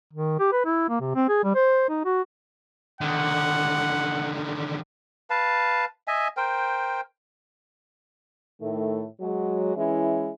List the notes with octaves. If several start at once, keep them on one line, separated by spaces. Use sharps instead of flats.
D#3
G4
B4
E4
A#3
C3
C4
G#4
G3
C5
D#4
F#4
D3 D#3 F#5
B4 F5 A5
D#5 E5 G#5
A#4 C5 G5
A2 D#3 A3
F#3 G#3
E3 G#3 C#4 E4